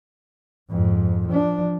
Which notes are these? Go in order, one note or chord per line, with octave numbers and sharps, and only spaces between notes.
F2 G#2
F3 D4